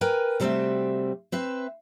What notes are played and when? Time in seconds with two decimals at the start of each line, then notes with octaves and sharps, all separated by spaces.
0.01 A#4 B4 G5 G#5
0.40 C3 G3 A3 C4 F#4 E5
1.32 C4 B4 E5